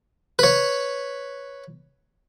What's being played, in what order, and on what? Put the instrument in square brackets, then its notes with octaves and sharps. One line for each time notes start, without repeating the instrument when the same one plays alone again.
[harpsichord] B4 C#5